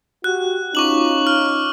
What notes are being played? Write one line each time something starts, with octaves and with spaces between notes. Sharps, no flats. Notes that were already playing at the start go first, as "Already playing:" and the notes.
F#4 G4 F#6
C#4 D#4 F4 C#6 D6 F#7
F6